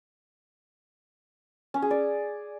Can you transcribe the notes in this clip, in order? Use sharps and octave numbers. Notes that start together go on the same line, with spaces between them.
C#4
G#4
D5